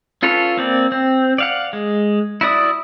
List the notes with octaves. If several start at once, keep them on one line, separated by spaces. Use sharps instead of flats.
C#4 F4 A4 B4 C#5
A#3 C4 D5
C4
D5 F5 F#5
G#3
E4 F#4 D5 D#6